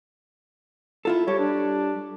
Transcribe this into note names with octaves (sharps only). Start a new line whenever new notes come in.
E4 F4 A4
G3 G4 A4 C#5
D4